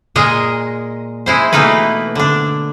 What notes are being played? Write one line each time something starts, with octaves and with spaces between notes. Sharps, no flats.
A#2 G#3 G#4 A#4 D#5
G#3 E4 C5
B2 E3 A3 A#3 D#4 B4
D3 D4